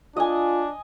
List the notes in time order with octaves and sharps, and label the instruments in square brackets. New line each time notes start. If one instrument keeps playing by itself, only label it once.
[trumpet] D4 [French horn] F4 [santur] D#5 G#5